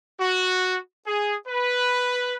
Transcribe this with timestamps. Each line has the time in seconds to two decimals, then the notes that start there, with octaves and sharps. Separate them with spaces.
0.20 F#4
1.05 G#4
1.47 B4